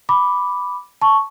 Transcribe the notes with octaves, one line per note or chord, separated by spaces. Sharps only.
B5 D6
A5 C#6